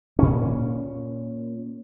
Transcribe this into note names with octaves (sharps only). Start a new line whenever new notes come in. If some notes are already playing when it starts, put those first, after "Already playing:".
A#2 C#4